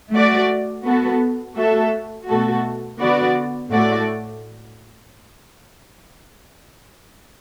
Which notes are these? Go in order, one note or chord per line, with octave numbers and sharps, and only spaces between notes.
A3 F#4 D5
B3 F#4 A4
A3 F#4 A4 E5
B2 A3 F#4 A4
D3 B3 F#4 D5
A2 A3 F#4 D5